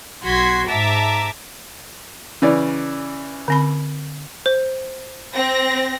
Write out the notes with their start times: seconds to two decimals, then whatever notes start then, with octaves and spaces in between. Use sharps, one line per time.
0.23 B1 F#4 C6 G#6 B6
0.68 G#2 E5 A5 A#5 D6
2.42 C#3 E3 D5
3.48 D3 C4 B5
4.46 C5
5.34 C4 A#6